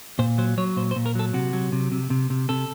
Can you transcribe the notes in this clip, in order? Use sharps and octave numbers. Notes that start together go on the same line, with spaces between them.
A#2 C5
F#3 C5
F#3 C#5
A#2 C5
C5
A#2
A#4
F#3 A4
C3 F#4
F#3
C3
C3
C3
C3
C3 A4